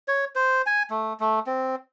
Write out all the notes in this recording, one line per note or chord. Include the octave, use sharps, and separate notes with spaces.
C#5
C5
G#5
A3
A3
C4